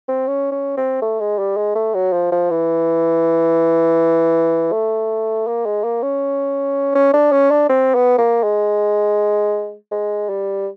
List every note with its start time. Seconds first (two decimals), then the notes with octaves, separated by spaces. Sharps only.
0.08 C4
0.27 C#4
0.52 C#4
0.77 C4
1.02 A3
1.20 G#3
1.38 G3
1.57 G#3
1.75 A3
1.94 F#3
2.13 F3
2.32 F3
2.51 E3
4.72 A3
5.47 A#3
5.66 G#3
5.84 A#3
6.02 C#4
6.95 C#4
7.13 D4
7.32 C#4
7.51 D4
7.69 C4
7.95 B3
8.18 A#3
8.44 G#3
9.91 G#3
10.29 G3